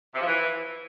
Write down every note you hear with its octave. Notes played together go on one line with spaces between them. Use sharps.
C3
F3
E3